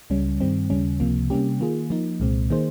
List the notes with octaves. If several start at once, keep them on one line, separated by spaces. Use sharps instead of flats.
C#2 C#3 G3 C#4
G2 D#3 G3 C4
D#2 C#3 G3 C#4
C#2 C3 F3 A#3
C3 G3 A#3 C#4 G4
D#3 A#3 F4 G#4
F3 A#3 D#4
C2 A#2 G#3 C4
D#3 A#3 D#4 G#4 C5